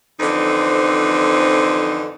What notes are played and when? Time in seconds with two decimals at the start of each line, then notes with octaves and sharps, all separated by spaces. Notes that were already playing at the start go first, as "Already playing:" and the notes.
0.19 F2 D3 E3 F3 C4 D#4